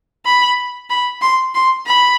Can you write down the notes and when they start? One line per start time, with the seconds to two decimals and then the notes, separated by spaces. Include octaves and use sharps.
0.26 B5
0.90 B5
1.22 C6
1.55 C6
1.86 B5